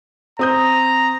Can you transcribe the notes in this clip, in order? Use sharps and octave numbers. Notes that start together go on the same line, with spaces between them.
C4 A#5 D#6 G6